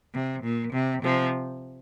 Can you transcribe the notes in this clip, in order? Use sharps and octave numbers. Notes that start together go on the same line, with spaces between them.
C3
A#2
C3
C3 F3